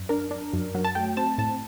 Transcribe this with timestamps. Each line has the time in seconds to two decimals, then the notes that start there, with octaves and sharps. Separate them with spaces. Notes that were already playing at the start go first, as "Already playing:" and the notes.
Already playing: F#2
0.09 D4 A#4
0.31 D4
0.53 F#2
0.75 F#3
0.84 A5
0.95 A3 G5
1.17 C4 A5
1.38 A2 A5